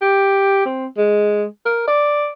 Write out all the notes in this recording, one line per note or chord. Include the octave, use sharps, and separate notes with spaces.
G4
C4
G#3
A#4
D5